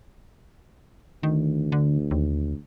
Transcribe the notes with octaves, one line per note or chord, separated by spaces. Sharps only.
D2 D#3
D3
D#2